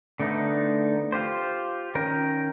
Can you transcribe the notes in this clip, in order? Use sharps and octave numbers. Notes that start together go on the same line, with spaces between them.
D3 A3 B3 D#4
F4 G4 C5
D#3 C#4 A#4 G5